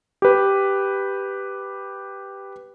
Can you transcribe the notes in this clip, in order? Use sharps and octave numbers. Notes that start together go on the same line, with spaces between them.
G4 B4